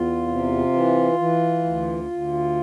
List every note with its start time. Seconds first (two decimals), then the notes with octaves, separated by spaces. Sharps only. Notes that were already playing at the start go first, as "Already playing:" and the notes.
Already playing: E2 F4
0.28 C3
0.73 E3
1.19 E3
1.64 D2
2.11 D2